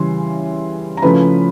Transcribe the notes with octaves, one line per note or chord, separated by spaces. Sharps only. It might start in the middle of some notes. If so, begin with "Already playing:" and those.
Already playing: C#3 E3 G3 C6
A#5
C#3 F3 A3 C#4 E4 B4 B5